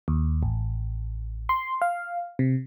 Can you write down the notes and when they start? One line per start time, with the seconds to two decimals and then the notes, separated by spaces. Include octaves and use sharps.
0.08 D#2
0.43 A1
1.49 C6
1.82 F5
2.39 C3